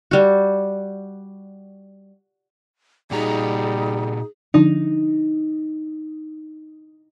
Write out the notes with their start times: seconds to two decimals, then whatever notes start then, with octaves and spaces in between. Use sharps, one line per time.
0.11 G3 F#4
3.11 A#2 G3 D#4 F#4 G#4 A#5
4.54 D3 F3 D4 D#4